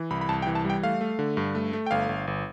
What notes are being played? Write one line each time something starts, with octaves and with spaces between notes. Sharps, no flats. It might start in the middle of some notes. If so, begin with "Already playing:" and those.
Already playing: E3
C2 B5
B5
C2 A5
G5
E3
A5
G3 G5
A3 F5
A3
D3
G2
A3
A3
G5
G1 F5
G1
G1